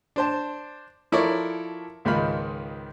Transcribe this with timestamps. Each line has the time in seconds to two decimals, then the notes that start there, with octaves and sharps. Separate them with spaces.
0.16 D4 C5 A5
1.12 F3 E4 A4 A#4 C#5 D5
2.05 C#2 G#2 D#3 F4 B5 F6